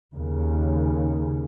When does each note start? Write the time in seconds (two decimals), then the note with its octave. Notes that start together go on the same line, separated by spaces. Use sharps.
0.15 D#2 C#3